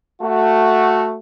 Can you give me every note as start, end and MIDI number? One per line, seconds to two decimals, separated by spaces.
0.22 1.18 57
0.22 1.18 66